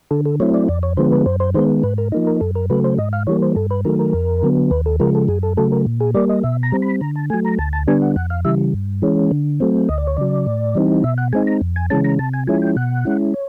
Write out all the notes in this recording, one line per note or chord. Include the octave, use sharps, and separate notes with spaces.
D3 A4
A4
F#3 A3 C4 E4 C#5
D5
F2 D5
C#5
D3 F3 G#3 B3 C5
B4
F#2 C5
C5
D#3 G#3 B3 C5
G#2 B4
A#4
F3 A#3 D#4
A#4
F#2 A4
A#4
C#3 F#3 A3 B4
C5
G#2 D#5
F5
E3 G3 A#3 C#5
C5
G2 A4
B4
D#3 F#3 A3 A#4
A#4
F2
D3 F#3 B3
D#2 B4
A4
C#3 F3 G#3 A#4
A4
F#2 G#4
A4
C#3 F#3 A3 A4
A#4
A#2
G#4
G3 A#3 D5
D#5
B2 E5
A#5
G3 C4
B5
D3 A#5
A5
F#3 A3 G#5
A#5
D2 A5
A5
D3 G3 B3 D4 G#5
F#5
F2 F#5
F5
C#3 E3 G3 E5
G2
E3 G#3 C#4
D3
F#3 A3 C4
D2 D#5
D5
C#5
C#3 F#3 D5
A2
E3 G3 C4 D#4
B2 E5
F#5
G#3 C4 D#4 G#5
A#5
F2
G#5
C#3 E3 G#3 C#4 A5
A#5
C3 A5
G#5
F3 G#3 C#4 E4 G#5
G5
B2 F#5
G#3 C#4 E4
C#5